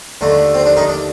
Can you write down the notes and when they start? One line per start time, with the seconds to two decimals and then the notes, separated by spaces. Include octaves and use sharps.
0.21 D#2 D3 A3
0.54 C4
0.66 D4
0.77 D#3 D#4
0.89 D4